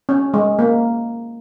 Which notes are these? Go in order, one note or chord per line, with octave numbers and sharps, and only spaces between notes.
C#4
G#3
A#3